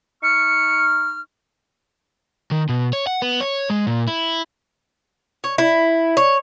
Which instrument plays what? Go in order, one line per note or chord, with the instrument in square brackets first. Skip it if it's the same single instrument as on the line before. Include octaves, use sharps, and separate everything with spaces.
[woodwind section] D#4 C#6 F6 [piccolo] C#7
[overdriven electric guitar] D#3
B2
C#5
F#5
B3
C#5
G#3
A#2
E4
[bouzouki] C#5
E4
C#5